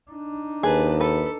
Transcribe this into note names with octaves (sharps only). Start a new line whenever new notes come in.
D4 D#4
D#2 G#4 B4 A5
A4 B4